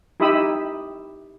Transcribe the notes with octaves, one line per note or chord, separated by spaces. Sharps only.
D#4 E4 G4 B5 D#6 E6